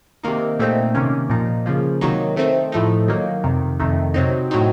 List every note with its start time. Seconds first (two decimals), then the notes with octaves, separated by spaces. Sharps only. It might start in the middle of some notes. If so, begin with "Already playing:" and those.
0.23 C3 D#3 A#3 D#4
0.59 A#2 A3 C4 D#4
0.95 C3 D#3 A#3 C#4
1.30 A#2 F3 A#3 D#4
1.66 C#3 F3 A#3
2.01 C3 D#3 F#3 A#3 D#4
2.36 D#3 A3 C4 D#4
2.72 A2 F3 A3 D#4
3.08 D#3 F#3 A#3 D#4
3.44 F2 C3 D#3
3.80 F2 C3 D#3 A3 D#4
4.14 C3 F#3 C4 D#4
4.51 A2 F#3 C4 D#4